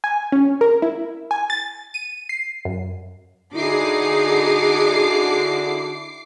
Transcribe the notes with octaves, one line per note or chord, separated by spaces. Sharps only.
G#5
C#4
A#4
E4
G#5
A6
D#7
C7
F#2
D3 D#4 E4 F#4 G#4 D6 C7